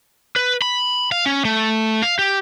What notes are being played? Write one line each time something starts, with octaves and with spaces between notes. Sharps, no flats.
B4
B5
F5
C#4
A3
F5
G4